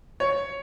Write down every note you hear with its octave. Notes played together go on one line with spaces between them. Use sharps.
C#5